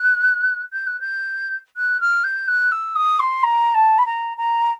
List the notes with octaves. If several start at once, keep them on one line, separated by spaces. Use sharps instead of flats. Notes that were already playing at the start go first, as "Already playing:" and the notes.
Already playing: F#6
G6
F#6
G6
F#6
F6
G6
F#6
E6
D#6
C6
A#5
A5
B5
A#5
A#5